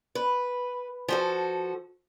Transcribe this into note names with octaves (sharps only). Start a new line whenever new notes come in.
B4
F3 F#4 A4